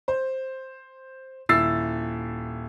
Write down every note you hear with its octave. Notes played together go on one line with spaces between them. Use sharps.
C5
D#1 E4 E6 A6 C7